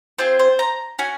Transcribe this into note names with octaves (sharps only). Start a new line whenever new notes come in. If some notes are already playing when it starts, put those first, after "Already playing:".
C4 F4 G#4 C5
C5
A#5
C#4 F#4 G#5